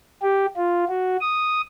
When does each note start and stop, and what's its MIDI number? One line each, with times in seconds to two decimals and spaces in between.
0.23 0.46 67
0.56 0.85 65
0.89 1.17 66
1.21 1.61 87